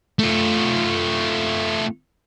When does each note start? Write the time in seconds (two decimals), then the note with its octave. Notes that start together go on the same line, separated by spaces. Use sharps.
0.19 A3 F4